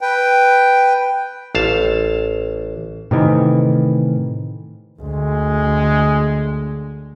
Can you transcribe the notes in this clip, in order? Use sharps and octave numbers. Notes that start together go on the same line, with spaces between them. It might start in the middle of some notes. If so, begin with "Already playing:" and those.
B4 G5
A1 F5 A5
A2 C3 D#3 E3
D2 G#3